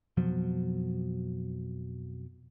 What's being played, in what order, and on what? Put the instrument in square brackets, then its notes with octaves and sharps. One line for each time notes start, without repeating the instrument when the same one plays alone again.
[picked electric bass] F2 B2 F3 F#3